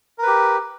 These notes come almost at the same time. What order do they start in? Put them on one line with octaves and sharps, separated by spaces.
A#4 B4 G4